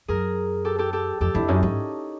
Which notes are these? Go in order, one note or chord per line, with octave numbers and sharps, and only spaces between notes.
F#2 G#4 A#4
G4 A4
G4 A4
G4 A4
F2 G4 A4
F2 D4 E4
F#2 C#4 D#4
G#2 C#4